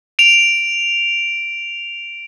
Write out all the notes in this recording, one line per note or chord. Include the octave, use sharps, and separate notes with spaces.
D7 F7